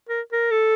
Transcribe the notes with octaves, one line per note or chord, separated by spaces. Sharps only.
A#4
A#4
A4